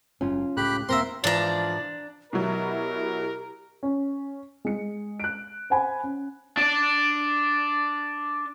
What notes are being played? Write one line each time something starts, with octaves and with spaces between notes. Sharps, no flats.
F#1 C#4 F4
C#2 A2 G4 B5 F#6
E1 A#3 C4 A#4 E5 A#5 C6
G#2 E3 F3 D4 D5 A5 A#5
B2 F#3 E4 G4 A#4
C#4
G#3 C#7
F#6 D7
C5 F#5 G#5 B5
C#4
D4 D5